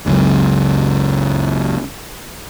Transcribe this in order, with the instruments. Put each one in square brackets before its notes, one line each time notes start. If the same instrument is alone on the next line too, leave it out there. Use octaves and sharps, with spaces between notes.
[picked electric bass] F#1 C#2 F#2